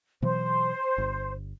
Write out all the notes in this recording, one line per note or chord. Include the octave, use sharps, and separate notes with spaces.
B2 E3 F#3 C5
G1